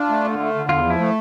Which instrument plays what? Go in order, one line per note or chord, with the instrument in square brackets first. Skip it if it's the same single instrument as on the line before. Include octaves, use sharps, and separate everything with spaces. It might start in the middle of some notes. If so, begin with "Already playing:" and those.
Already playing: [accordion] D4 [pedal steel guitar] F4
[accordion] A3
D3
A3
D3
[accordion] E2 [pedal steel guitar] F4
[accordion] F3
[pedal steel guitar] E4
[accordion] A3